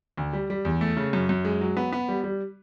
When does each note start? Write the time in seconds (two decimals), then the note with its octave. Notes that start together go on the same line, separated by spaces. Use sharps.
0.17 D2
0.33 G3
0.50 G3
0.65 E2
0.81 A3
0.97 C#3
1.13 F#2
1.29 F#2
1.45 G#3
1.61 F#3
1.77 B3
1.92 B3
2.09 G3
2.24 G3